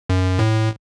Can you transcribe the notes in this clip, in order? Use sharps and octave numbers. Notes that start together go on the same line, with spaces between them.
F#2
A2